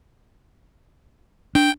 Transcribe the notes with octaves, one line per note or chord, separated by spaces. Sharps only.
D4 G5